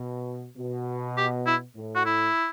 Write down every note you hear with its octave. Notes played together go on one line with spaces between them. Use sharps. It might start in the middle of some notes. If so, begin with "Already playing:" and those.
Already playing: B2
B2
G4
E4
A2
F#4
E4